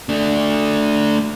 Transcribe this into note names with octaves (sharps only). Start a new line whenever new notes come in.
A3 D4